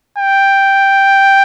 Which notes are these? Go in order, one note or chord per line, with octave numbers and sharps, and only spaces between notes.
G5